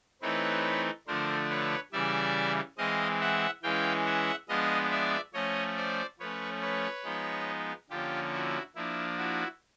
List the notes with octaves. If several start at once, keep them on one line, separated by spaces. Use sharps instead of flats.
E3 A3 C4 D#4 B4 C#5
D3 F3 A3 D4 A#4 C5
B4 C#5
C#3 E3 G3 D5 E5
E3 G#3 C4 D#5 F5
E5 F#5
E3 G#3 C#4 F5 G5
E5 F#5
F3 G#3 B3 D4 D#5 F5
D5 E5
F3 A3 C#4 C#5 D#5
C5 D5
F3 A3 C#4 B4 C#5
B4 C#5
F3 G#3 B3 D#4
D3 F3 A#3 C#4 F4 G4
E4 F#4
F3 A#3 D4 E4
E4 F#4